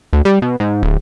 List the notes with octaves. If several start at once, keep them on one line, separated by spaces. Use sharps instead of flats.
D2
G3
B2
G#2
D1